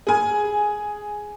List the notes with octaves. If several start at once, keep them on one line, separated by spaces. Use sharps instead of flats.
G#4 G#5